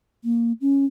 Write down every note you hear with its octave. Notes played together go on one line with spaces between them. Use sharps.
A#3
C#4